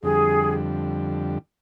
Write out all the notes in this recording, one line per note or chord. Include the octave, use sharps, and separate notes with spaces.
F2 D3 G3 G#4